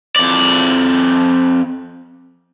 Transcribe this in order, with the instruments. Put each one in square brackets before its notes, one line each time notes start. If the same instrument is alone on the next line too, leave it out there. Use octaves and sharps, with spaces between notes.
[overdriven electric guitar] F2 D5